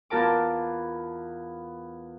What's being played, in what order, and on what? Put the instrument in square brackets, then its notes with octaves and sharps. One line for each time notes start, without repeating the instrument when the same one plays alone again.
[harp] E2 F4 A#4 A5 D6